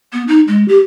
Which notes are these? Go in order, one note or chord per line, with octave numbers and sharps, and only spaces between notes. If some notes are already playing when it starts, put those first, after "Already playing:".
B3
D#4
G#3
G4